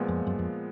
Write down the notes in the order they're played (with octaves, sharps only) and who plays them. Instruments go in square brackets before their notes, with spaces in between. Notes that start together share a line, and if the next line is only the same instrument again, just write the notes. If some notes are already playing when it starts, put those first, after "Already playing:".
Already playing: [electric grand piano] A#2 F3 G#3 B3
[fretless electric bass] F2
F#2
F2